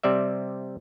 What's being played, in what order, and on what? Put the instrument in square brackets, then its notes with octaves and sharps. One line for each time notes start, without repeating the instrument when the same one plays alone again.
[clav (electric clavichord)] C3 G3 C4 D5 E5